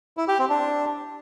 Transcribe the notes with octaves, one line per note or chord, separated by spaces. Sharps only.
E4
G4
C4
D4